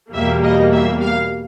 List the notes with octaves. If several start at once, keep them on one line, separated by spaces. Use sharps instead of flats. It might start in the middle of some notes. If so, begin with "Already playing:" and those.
E2 B2 G3 A#3 E5
D#5
E5
F5